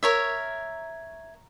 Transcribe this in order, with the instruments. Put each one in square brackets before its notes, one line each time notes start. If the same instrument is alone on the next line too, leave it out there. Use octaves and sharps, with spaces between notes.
[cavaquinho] A#4 C#5 E5